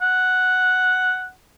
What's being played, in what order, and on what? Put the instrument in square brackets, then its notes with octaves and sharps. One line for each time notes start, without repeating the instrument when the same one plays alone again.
[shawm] F#5